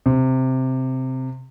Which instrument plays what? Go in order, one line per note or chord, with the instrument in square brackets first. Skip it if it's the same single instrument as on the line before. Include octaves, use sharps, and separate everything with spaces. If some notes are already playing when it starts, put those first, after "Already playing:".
[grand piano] C3